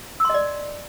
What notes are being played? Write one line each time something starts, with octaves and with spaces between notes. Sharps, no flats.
D5 D#5 C6 E6